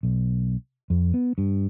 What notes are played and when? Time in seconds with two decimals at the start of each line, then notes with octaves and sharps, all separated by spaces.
0.03 B1
0.90 F2
1.14 B3
1.38 G2